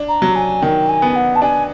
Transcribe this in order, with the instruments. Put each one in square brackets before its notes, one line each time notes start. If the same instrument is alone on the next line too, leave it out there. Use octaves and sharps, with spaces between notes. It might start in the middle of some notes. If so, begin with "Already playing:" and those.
Already playing: [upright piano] D4
[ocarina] A#5
[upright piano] F#3
[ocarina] G#5
[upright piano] D#3 [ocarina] G5
[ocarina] G#5
[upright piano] B3
[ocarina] F#5
A5
[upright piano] D4 [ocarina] G#5